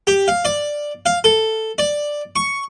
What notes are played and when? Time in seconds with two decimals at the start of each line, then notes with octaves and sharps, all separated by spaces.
0.07 G4
0.28 F5
0.45 D5
1.06 F5
1.24 A4
1.78 D5
2.36 C#6